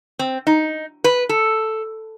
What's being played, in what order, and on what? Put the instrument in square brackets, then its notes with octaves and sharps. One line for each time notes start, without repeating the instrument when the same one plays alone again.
[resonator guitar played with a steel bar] C4
D#4
B4
A4